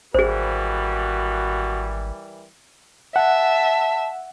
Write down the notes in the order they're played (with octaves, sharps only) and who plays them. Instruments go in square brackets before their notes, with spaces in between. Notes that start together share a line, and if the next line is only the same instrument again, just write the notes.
[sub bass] G#1 [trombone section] E3 G3 A#4 [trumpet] F#4 [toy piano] G#4 C5
[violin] E5 [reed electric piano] F#5 [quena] A5